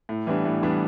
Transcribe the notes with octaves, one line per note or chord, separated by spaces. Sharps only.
A2
E3 G3 B3 D4
A2
E3 G3 B3 D4